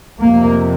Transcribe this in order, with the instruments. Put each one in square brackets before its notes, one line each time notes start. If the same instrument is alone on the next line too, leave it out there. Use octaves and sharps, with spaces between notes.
[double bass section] F2 C3 A#3